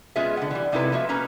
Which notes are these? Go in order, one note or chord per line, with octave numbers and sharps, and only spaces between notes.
G#3 B3 C#4 F4 G#4 E5
D3 F#5
E3 G3
C3 G#3 D#4 E4 A4 B4
F3 A#3 F#4 E5
A#3 C#4 A4 B4 A#5